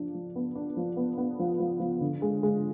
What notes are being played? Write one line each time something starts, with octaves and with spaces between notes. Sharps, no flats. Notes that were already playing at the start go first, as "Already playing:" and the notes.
Already playing: F3 D4
F3
B3
D4
F3
B3
B3
F3
F3
F3
D3
G#3
G#3